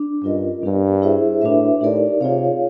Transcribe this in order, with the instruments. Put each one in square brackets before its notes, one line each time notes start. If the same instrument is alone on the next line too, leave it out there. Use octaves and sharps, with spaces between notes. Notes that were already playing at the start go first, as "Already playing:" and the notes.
Already playing: [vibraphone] D4
[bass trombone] G2 [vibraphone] C#4 F4 A#4 D#5
[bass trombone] G2 [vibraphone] B3 D4 G4 A#4
[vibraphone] E4 G#4 C5 E5
[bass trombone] A2 [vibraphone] D4 F#4 B4 E5
[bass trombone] A2 [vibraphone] D#4 G4 A#4 D5
[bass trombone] C3 [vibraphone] F4 G#4 C#5 F5